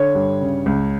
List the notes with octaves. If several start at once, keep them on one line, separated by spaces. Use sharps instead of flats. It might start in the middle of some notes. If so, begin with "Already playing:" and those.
Already playing: D3 C#5
G2
C#3
C#2